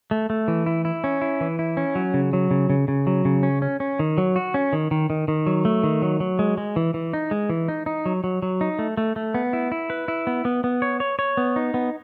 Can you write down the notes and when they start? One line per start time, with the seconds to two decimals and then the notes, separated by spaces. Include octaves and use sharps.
0.11 A3
0.30 A3
0.48 E3
0.66 E4
0.85 E4
1.04 C#4
1.21 E4
1.41 E3
1.59 E4
1.77 C#4
1.95 F#3
2.14 C#3
2.33 F#3
2.51 C#3
2.70 C#3
2.88 C#3
3.07 F#3
3.25 C#3
3.43 C#4
3.62 C#4
3.80 C#4
3.99 D#3
4.18 F#3
4.36 F#4
4.54 C#4
4.73 D#3
4.91 D#3
5.10 D#3
5.28 D#3
5.46 F#3
5.65 A3
5.83 D#3
6.02 F#3
6.20 F#3
6.39 G#3
6.58 G#3
6.76 E3
6.94 E3
7.13 D#4
7.31 G#3
7.49 E3
7.68 D#4
7.86 D#4
8.06 F#3
8.24 F#3
8.42 F#3
8.61 D#4
8.79 A3
8.97 A3
9.16 A3
9.34 B3
9.53 E4
9.72 E4
9.90 B4
10.08 E4
10.27 B3
10.45 B3
10.64 B3
10.82 C#5
11.00 C#5
11.19 C#5
11.37 B3
11.56 D#4
11.74 B3